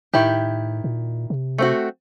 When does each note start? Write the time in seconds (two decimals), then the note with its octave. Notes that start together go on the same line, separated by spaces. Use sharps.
0.14 A2 D#3 E4 G4
0.84 A#2
1.30 C3
1.58 A3 C4 F#4